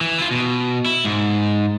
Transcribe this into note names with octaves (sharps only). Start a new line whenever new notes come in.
E3
E4 F4
B2
E4
G#2